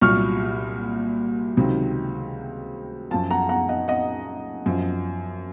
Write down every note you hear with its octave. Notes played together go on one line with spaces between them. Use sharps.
C2 A#2 F#3 C#6 F6
C#2 C3 D#3 F#3
F#2 F3 F5 A5
F#5 A#5
F#5 A#5
D#5 F#5
D#5 F#5
F#2 F3